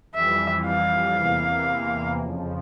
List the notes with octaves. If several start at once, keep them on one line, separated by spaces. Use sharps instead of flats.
F2 E3 G3 E5
F5
E2 C3 E3 A#3
F2 C#3 F3